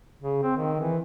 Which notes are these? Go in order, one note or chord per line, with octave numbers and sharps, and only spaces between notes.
C#3
C4
D#3
E3